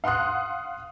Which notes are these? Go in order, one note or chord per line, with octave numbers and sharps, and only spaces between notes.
F5 F#5 C6 D#6 F#6